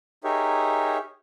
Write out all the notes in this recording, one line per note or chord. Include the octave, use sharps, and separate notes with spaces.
D#4 G4 G#4 A#4 C#5 E5